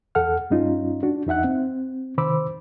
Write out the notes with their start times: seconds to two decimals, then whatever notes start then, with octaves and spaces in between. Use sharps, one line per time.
0.15 E2 A4 F#5 F6
0.50 G2 G3 C#4 D#4 F4
1.03 D4 F#4
1.27 E2 D#4 E5 F#5 F#6
1.44 C4
2.18 C3 D#3 C5 B5 D6 E6